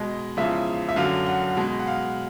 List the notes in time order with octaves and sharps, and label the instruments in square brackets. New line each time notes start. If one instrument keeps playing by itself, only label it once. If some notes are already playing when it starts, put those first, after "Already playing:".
Already playing: [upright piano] B2 G#3 D#5
E2 C#3 F3 G#3 E5
E5
F#2 D3 F#3 F5
F#5
B2 G#3
F#5
F5